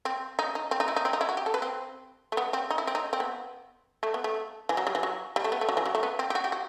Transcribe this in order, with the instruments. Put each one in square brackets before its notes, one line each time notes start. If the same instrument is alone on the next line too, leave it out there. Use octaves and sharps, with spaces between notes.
[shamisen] C4
D#4
D#4
C4
D#4
E4
D#4
C4
D#4
E4
F#4
G4
A4
B4
C4
A3
B3
C4
D#4
E4
C4
D#4
C4
B3
A3
B3
A3
E3
F#3
G3
E3
F#3
G3
A3
B3
A3
F#3
E3
F#3
A3
B3
C4
G4
F#4
G4
F#4